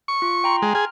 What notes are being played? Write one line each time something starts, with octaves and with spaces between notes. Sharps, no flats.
C#6
F4
G5 A#5 C6
G#3
G#4 F6